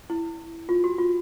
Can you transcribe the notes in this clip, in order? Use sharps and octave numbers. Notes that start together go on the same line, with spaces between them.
E4
F4
F#4
F4